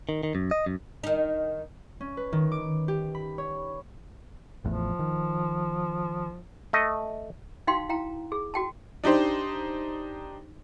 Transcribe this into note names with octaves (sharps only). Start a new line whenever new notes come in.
D#3
D#3
F#2
D#5
F#2
D#3 D#4
C#4
B4
D#3
D6
G4
B5
C#5
A1 E2 A2 F3
D#3
A3 D#5
D#4 F#4 F5 G5 C6
E4 F5 G5 A#5
G#4
F#4 G5 A5
D4 D#4 G4 C5